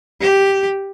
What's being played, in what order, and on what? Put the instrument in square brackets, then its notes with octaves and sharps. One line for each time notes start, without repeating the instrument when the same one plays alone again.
[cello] G4